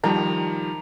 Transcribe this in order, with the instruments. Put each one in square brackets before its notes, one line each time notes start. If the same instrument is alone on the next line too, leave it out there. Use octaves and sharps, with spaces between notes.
[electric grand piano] D#3 F3 G3 [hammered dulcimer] A#5